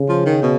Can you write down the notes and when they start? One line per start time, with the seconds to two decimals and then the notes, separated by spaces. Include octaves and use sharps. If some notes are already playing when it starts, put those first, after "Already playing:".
Already playing: C#3
0.09 F3
0.26 D#3
0.43 B2